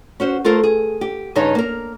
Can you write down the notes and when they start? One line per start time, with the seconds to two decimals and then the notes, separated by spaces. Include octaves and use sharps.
0.20 C#4 F#4 C5
0.45 A3 F4 A4 A#4 C5
0.63 G#4
1.01 G4
1.35 G2 C#3 D#4 C#5 D#5
1.55 A#3 A#4